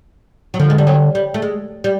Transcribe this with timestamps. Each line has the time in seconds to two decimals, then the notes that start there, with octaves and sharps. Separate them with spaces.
0.54 F#3
0.60 D3 F3
0.70 G#3
0.78 G3
0.87 F#3
1.15 G3
1.34 A3
1.42 G#3
1.84 G3